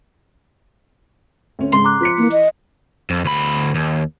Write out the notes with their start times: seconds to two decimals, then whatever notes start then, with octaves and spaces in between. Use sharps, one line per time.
1.59 D2 C#4
1.72 G#2 C#3 G#3 C6
1.84 A#5 D6 F#6
2.01 F3 B6 C#7
2.18 E3 A#3
2.32 D#5
3.10 F2
3.25 D2 B5
3.75 D#2